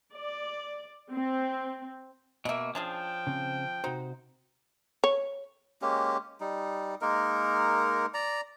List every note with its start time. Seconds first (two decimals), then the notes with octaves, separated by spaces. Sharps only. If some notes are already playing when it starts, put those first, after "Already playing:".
0.12 D5
1.10 C4
2.45 B2 A#3 D#5 E5
2.75 F3 C#4 D4 G#4 G5
3.27 C#3 C4
3.84 C3 D#4 F#4 C5
5.04 C#5
5.82 G#3 A#3 C#4 G4
6.40 G3 D#4
7.02 G#3 A#3 D#4 A#4
8.14 D5 A#5